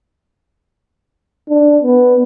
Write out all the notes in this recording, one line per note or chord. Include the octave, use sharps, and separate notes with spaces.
D4
B3